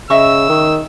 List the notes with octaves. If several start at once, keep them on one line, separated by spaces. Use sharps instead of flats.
C#3 D#5 E5 C#6 E6
D#3